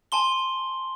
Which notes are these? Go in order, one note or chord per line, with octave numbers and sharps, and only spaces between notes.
G#5 A5 C6 G7